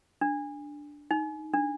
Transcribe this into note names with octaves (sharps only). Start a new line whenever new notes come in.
D4
D#4
D4